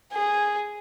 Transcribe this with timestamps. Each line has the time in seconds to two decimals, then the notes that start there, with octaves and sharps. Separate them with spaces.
0.14 G#4